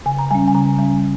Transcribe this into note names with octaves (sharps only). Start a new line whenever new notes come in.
C#3 G#5
A#5
G3 C#4 G#5
G#5
C#3 A#5
G3 C#4